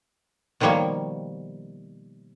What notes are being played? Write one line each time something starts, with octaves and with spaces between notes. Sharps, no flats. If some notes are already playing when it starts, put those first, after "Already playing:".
B2 D#3 F3 G3 A#3 C#5